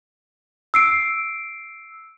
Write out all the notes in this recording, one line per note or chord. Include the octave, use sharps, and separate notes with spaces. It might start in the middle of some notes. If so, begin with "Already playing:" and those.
E6 C7 D7